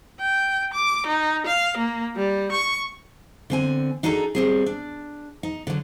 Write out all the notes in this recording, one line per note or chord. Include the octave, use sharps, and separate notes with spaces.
G5
D6
D#4
F5
A#3
G3
C#6
D3 C4 G#5
D4 D#4 F#4 G#4 A4 A#5
G3 C4 G#4
D4
D#4
D3 F#3